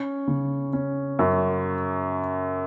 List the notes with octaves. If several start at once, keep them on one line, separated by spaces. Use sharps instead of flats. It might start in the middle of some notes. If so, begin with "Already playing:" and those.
Already playing: C#4
C#3
C#4
F#2